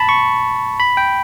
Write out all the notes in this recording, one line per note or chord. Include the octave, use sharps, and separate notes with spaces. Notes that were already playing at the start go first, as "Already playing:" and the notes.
Already playing: A5 B5
C#6
B5
G5